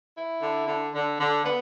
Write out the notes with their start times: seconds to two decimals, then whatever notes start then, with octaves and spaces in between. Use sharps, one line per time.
0.16 E4
0.42 D3
0.67 D3
0.94 D3
1.19 D3
1.44 B3